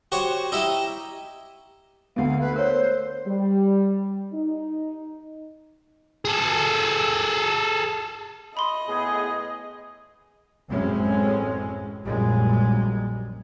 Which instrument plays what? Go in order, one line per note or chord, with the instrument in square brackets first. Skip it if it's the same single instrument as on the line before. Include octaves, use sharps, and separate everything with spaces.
[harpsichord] F#4 G4 C5 C#5
D#4 E4 G4 E5
[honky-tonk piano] D2 B3 [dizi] F5
[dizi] B4
[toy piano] A#4 C#5 [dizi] C5
[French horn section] G3
D#4
[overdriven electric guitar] G#4 A4
[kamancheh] D#5 [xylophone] B5 C6
[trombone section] A2 B3 G#4
[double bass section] A1 F#2 A2 G#3 C4 C#4
A#1 F#2 A#2 G3 G#3